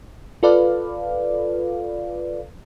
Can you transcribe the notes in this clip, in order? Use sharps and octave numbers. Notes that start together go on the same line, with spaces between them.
F4 A4 B4 D5 F5